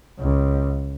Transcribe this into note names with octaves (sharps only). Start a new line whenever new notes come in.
C#2